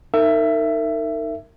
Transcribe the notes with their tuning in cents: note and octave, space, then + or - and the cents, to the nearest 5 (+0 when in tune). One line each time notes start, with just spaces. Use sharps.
D#4 +0 A#4 -35 E5 +15